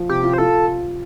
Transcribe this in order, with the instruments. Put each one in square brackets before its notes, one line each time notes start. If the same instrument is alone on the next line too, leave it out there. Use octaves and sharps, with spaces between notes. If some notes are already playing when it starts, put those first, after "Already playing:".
Already playing: [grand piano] F3
[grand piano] C3 [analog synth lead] G4
[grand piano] F4
[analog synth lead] C5
[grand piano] F4 [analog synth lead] A4